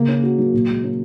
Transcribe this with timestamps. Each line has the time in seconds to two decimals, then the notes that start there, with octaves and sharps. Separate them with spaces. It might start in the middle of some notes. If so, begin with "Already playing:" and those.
Already playing: C#3 A#3 A#4
0.09 C#4
0.23 F#4
0.38 F#3
0.53 A#2
0.69 G#3
0.84 C#4